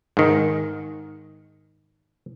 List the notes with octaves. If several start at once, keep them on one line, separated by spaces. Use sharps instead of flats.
G#2 D#3